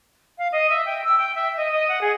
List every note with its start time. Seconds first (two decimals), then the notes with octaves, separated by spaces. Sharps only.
0.38 F5
0.52 D#5
0.69 E5
0.86 G5
1.04 E6
1.18 G5
1.35 E5
1.57 D#5
1.72 D#5
1.88 F#5
2.01 G#4